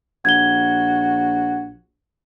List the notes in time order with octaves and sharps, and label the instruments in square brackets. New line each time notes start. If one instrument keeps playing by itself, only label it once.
[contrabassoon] A#1 [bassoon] F#4 [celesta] G#6 G7